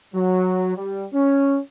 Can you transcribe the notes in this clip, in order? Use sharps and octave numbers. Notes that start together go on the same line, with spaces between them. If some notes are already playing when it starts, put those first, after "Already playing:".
F#3
G3
C#4